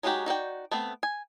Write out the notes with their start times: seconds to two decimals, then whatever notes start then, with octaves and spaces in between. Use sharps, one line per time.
0.03 F#3 G#3 D#4 F#4 G4
0.26 D#4 F#4 D5 G5
0.72 A3 B3 C4
1.03 G#5